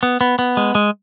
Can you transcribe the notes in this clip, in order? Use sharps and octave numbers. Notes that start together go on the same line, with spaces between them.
B3
B3
B3
G#3
G#3